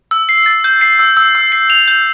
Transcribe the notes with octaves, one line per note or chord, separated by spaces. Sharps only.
E6
C7
A6
G6
C7
E6
E6
E6
C7
F7
G6